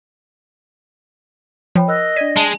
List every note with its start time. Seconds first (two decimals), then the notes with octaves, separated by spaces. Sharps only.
1.75 F3 C#5 G5 B5
1.88 A#4 D#5 E6 F#6
2.16 D4 D5 G#6 B6 D#7
2.37 G#3 A5